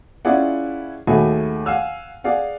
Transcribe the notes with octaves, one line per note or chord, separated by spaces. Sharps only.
C#4 E4 F4 G#4 D5 F#5
D#2 A3 F#4 G#4 G#5 B5
F5 F#5 G#5 E6 F6
G#4 D5 F5 F#5